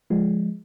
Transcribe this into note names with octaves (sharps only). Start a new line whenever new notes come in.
F3 G#3